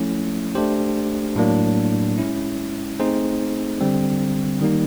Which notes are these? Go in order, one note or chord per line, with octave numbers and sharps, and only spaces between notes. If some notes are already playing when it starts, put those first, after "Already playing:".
Already playing: F3 A3 C#4 E4
A3 D4 G4 C5
A2 F#3 A#3 D4
G#3 C#4 E4
A3 C4 D#4 G#4 C5
D3 G3 C4
D#3 G3 A#3 D#4